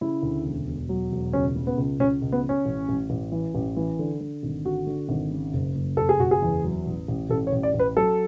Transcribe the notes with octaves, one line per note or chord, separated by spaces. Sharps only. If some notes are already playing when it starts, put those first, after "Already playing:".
C#3 E4
D2
E1
E1
F#3
E1
C#2 C#4
C#3
B3
C#2
C#2 C#4
C#2
B3
C#3
C#4
A1
A1
A1
E3
A1
E3
D3
D3
G#1
D3 F#4
D3
G#1
C#3
F#1
F#1
F#1 A4
G#4
F#1 F#4
G#4
E2
F#3
A1
A1
A1 A4
C#5
A1
D5
A1
B4
F#3 A4